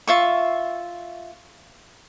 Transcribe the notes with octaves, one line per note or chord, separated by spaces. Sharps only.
F4 E5 C#6